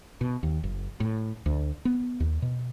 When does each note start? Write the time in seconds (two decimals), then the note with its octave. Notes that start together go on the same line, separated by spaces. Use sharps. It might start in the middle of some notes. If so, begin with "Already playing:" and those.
0.21 B2
0.43 D#2
0.63 F#1
1.00 A2
1.46 D2
1.85 B3
2.20 D#2
2.42 B2